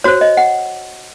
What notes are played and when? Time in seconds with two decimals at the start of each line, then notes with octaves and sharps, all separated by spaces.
0.04 F#4 C5 C#5
0.21 D#5
0.37 F#5